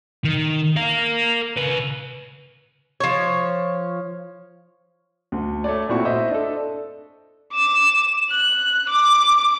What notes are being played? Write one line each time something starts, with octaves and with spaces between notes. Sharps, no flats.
D#3
A#4 F5
C#3 B4
F3 C#5
D2
A3 C#5 D5
A#2 C4 E4 F#4 C#6
C5 D#5 E5
D4 A4
D6 E7
F#6
D6